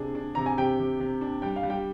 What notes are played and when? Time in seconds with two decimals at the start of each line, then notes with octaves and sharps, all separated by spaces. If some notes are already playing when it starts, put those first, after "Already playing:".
Already playing: C3 D4 G#4
0.15 D4
0.35 C3 A#5
0.46 G#5
0.58 C3 G4 G5
0.79 C3
1.00 C3
1.21 D4
1.42 G3 G5
1.56 F5
1.63 G3
1.70 G4 G5